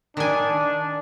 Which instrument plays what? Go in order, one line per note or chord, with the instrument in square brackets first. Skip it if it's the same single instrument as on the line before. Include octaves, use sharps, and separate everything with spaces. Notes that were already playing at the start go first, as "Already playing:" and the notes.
[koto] D#3 G#5 [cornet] D4